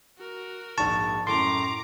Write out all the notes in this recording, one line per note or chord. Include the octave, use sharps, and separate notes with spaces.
F#4 A#4
A#1 G#2 A5 C#6
F#2 A2 A#5 C6 D6